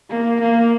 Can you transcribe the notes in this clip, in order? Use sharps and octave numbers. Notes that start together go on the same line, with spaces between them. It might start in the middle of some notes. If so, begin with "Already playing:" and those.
A#3
A#3